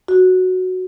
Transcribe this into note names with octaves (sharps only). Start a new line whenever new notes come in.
F#4